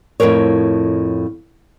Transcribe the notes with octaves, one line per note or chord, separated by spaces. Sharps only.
F2 A2 G#3 A#4 C#5